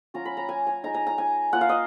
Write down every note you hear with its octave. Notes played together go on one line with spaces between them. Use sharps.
F#3 C#4 F4 A#5
B5
A#5
G#5
G#5
G#3 D#4 A#5
A#5
A#5
G#5
A#3 F4 F#5
F5
D#5